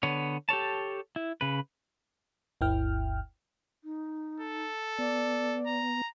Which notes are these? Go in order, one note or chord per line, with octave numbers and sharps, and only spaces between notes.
D3 B3 C#5
G4 A4 C#5 A5
E4
C#3 B4
G1 D2 E4 G5 F6
D#4
A4
B3 D5
A#5